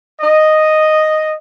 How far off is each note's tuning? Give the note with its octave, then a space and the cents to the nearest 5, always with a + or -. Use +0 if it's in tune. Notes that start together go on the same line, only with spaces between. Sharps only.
D#5 -5